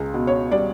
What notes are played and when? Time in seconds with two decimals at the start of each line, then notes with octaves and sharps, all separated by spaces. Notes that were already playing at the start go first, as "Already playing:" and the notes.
Already playing: C#2 G#4
0.14 B2
0.27 C#5
0.51 G3 D5